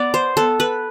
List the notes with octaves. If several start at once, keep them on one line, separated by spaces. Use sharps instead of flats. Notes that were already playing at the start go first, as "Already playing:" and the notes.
Already playing: B3 D5
C5
B3 A4
B4